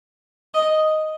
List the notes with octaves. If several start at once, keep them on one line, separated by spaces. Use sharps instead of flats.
D#5